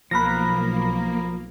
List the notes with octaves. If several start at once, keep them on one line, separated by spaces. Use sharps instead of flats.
B1 F3 A#3 A#4 B5 F#6 A#6